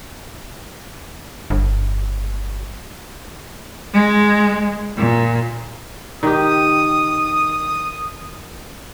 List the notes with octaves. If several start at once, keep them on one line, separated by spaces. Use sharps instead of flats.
G1
G#3
A#2
D#3 G4 D#6